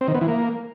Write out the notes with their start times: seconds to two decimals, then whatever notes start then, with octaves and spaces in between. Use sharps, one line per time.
0.01 C4
0.08 D#3
0.14 B3
0.21 E3
0.28 A#3